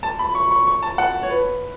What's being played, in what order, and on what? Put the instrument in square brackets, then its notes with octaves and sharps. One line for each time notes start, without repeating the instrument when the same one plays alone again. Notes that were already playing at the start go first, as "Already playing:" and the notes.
[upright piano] A5
B5
C#6
C#6
C#6
A5
F#5
C#5
B4